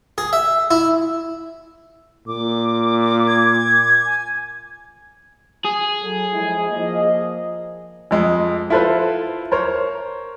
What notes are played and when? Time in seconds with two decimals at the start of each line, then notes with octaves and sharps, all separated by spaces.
0.18 G#4
0.33 E5
0.71 E4
2.27 A#2 D6
3.28 G#6
4.05 G#5
5.65 G#4
6.02 F#3 A4
6.33 F3 G#3 E4
6.69 F3 A#3 D#5
8.11 F2 G#3
8.70 E4 F4 A4 B4 C5
9.52 A#4 C5 C#5